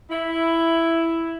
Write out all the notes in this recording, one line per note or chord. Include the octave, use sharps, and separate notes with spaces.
E4